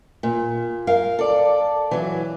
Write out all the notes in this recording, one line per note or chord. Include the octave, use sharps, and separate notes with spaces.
A#2
A#4 F5
A4 D5
E3 F#3